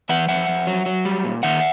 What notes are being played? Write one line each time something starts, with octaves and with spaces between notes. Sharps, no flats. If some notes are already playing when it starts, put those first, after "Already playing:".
E3 E5 F#5
F2 E5 F#5
F2
F#3
F#3
G3
A#2
D#3 E5 F#5